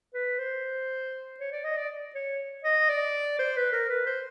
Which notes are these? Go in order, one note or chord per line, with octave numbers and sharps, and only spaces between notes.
B4
C5
C#5
D5
D#5
D5
C#5
D#5
D5
C5
B4
A#4
B4
C5